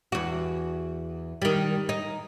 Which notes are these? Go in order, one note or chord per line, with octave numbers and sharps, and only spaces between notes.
E2 F#4
D#3 G3
D#4